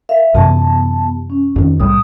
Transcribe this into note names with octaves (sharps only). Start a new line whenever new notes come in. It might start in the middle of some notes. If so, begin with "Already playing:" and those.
A#4 E5 F5
F#2 C3 E3 B3 G4 A5
C#4
F2 D#3
C2 A2 G3 D#6